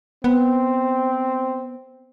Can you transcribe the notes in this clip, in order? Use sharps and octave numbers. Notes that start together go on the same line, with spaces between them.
B3 C4